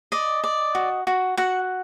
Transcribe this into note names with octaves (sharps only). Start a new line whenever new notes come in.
D5 D#5
D5
F#4
F#4
F#4 F#5